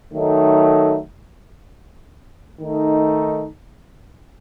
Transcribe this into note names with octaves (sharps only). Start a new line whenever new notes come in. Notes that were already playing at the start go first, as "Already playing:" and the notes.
D#3 F#3 A3 D#4
D#3 A3 D#4